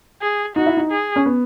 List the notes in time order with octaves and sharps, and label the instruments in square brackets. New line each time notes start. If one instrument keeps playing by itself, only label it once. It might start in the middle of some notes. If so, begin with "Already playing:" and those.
[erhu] G#4
[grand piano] D#4 [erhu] F#4
[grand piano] E4
D#4
[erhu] G#4
[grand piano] C#4
B3